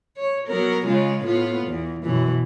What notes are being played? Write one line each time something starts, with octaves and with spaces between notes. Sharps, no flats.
C#5
F#3 B3 A#4
C#3 G#3 F4
A2 B3 F4
E2
F#2 B2 E3